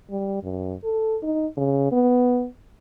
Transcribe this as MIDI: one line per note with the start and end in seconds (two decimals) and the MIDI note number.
0.10 0.41 55
0.43 0.74 42
0.84 1.17 69
1.23 1.46 63
1.57 1.92 49
1.92 2.47 59